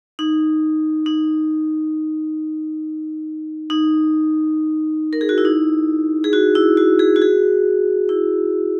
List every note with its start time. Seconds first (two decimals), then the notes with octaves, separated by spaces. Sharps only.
0.19 D#4
1.06 D#4
3.70 D#4
5.13 A#4
5.21 G#4
5.29 F#4
5.38 E4
5.45 D#4
6.24 G#4
6.33 F#4
6.55 E4
6.77 F#4
6.99 G#4
7.16 F#4
7.22 G#4
8.09 E4